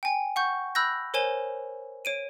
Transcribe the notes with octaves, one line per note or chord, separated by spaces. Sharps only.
G5 G#5
F#5 C#6 G6
B5 E6 F#6 G6 A#6
A#4 C5 C#5 G#5 E7 G7
C#5 D7 D#7